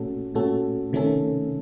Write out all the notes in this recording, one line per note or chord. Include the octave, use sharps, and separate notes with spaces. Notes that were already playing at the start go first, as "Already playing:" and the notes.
Already playing: A#2 A3 C#4 F#4 A4
A#2 A3 C#4 F#4 A4
C3 D#3 A3 C#4 A4